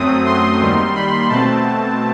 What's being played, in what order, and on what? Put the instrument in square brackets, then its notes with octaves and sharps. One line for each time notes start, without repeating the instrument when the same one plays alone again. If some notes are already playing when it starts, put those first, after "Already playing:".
Already playing: [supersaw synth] F#2 F#3 A3 C4 D#6
C6
D#2 D#3 G3
B5
B2 A3 C4 A5